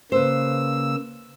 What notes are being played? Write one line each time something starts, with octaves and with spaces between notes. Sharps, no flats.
C#3 A#3 B4 C5 E6